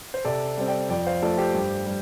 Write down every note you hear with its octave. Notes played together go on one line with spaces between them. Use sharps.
C5
C3 A4 D5
G3 C4
D5 G5
F2 D5 G5
C5 F5
F3 A3 A4 D5
G4 C5
G2
G3